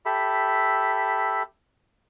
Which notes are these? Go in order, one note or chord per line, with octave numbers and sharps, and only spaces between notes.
G4 A4 E5 B5